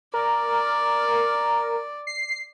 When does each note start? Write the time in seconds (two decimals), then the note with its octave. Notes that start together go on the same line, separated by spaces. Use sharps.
0.14 A#4 D5
2.07 C7